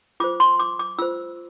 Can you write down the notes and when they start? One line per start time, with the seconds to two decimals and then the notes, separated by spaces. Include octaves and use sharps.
0.20 F4 C5 D6
0.40 C6
0.59 D6
0.79 D6
0.99 F4 C5 E6